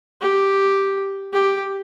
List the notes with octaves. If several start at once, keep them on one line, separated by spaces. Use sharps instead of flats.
G4
G4